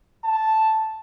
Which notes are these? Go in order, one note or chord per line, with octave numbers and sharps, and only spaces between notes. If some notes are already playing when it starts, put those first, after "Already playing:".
A5